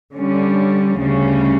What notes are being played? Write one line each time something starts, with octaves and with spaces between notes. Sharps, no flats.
D3 G3 C#4
D2 C#3 G3 C#4